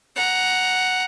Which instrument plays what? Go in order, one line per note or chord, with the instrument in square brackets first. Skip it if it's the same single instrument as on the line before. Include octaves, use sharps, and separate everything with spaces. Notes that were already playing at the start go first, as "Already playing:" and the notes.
[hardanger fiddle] F#5 A#5